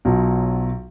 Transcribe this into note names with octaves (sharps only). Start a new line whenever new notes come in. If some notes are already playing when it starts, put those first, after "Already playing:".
B1 F#3 F4